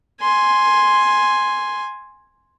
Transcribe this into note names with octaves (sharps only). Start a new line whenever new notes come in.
G#5 C6